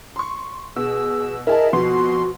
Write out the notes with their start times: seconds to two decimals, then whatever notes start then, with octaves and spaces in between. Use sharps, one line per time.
0.16 C6 C#6
0.76 B2 G#4 E6
1.47 E4 G#4 A#4 D#5 A5
1.73 F2 B2 B3 F#4 C6